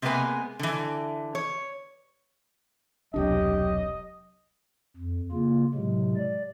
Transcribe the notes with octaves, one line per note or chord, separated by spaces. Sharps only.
C3 G#3 A#3 B3 B4 G#5
D3 E3
C#5
E1 C2 F#3 D4 G4 D#5
F2
C#3 A#3 F4
A2 C3 F#3 G#3
D5